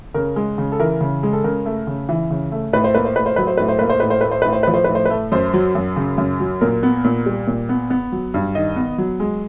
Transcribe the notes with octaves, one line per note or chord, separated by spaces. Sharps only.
C#3 A#4
G#3
C#3
A4
E3 A#4
C#3
G#3
A4
C#3 A#4
A3
C#3
E3
C#3
A3
A2 B4
C5
A#3 B4
C5
A2 B4
C5
F#3 B4
C5
A2 B4
C5
A#3 B4
C5
A2 B4
C5
A3 B4
C5
A2 B4
C5
F3 B4
C5
A2 B4
C5
B4
A3
F#2 C5
F#3
F#2
C#3
F#2
F#3
A#2 A#4
B3
A#2
G3
A#2
B3
B3
F#3
G2
D#3 D#5
B3
F#3
G#3